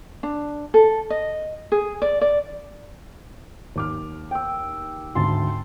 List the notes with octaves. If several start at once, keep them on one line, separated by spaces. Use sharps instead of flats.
D4
A4
D#5
G#4
D5
D5
D#2 D6 F6
G5 E6
G#1 D2 G#2 A5 C6